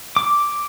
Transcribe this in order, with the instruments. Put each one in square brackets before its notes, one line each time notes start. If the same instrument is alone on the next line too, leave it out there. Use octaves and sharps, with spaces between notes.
[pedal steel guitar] D6